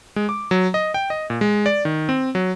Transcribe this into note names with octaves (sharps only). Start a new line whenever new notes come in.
G#3
D6
F#3
D#5
G5
D#5
A#2
G#3
D5
D#3
C4
F#3